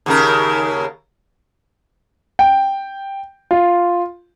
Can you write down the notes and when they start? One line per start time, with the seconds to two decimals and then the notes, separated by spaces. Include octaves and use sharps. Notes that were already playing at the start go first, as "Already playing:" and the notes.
0.06 D#2 C#3 A#4
2.39 G5
3.51 F4